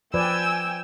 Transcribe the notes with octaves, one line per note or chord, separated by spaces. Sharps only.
F3 B4 D5 G5 G#5 E6